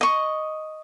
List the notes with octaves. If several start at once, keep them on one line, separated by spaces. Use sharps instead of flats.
D#5 C#6